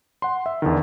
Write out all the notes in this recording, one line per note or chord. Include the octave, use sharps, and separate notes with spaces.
F#5 C6
E5
E2 D3 D#3